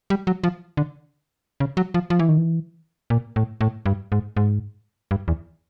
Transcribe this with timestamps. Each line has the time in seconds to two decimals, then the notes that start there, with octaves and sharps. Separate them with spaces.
0.10 G3
0.27 F#3
0.44 F3
0.77 D3
1.60 C#3
1.77 F#3
1.94 F3
2.10 F3
2.19 E3
2.29 D#3
2.38 E3
3.10 A#2
3.36 A2
3.61 A2
3.86 G2
4.12 G#2
4.37 G#2
5.11 G2
5.28 E2